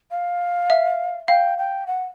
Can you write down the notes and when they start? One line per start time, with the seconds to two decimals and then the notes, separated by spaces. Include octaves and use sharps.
0.11 F5
0.70 E5
1.28 F5 G5
1.58 G5
1.87 F#5